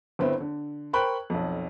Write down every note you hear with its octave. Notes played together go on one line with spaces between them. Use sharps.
G1 B3 C4 E4
D3
A#4 C5 G5 B5 C#6 F#6
B1 F2